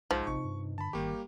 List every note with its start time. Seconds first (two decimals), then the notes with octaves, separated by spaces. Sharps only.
0.11 B1 G#2 F3
0.27 A1 C3 D#4 C#6
0.44 G2
0.78 D3 A5 B5
0.93 G1 D#3 G3 A#3 G4 G5 C#6